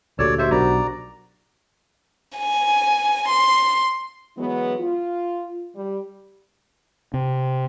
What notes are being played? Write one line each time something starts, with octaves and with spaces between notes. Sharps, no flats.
D2 A#2 F#4 G4 A4 C#5 D5
F#4 G4 C5 D#5 E5
B1 D4 F#4 A#4 C5 D5 A#5
G#5
C6
E3 F#3 G#3 B3
F4
G3
C3